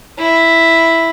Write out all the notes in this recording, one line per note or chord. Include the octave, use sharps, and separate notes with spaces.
E4